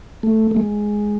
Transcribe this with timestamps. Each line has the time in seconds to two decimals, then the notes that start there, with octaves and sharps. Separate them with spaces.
0.23 A3
0.51 A3
0.56 G#3